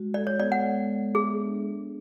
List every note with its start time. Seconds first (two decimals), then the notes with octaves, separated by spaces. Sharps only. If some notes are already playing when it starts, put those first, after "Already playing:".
Already playing: G#3 F#4
0.14 A4 D5
0.27 C#5
0.39 B3 D5
0.52 F#5
0.65 G#3
0.89 A4
1.15 G#4 E5
1.40 D4
1.65 B3